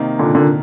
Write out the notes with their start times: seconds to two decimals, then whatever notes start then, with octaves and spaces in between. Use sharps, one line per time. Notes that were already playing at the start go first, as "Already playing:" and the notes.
Already playing: C3 D#3 A#3 D#4
0.19 A#2 D3
0.35 A#2 D3